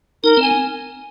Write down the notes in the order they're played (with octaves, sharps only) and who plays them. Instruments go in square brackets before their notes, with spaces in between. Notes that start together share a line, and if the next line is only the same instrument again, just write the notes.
[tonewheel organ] D#4 [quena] A#4
[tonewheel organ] C4
[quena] G#5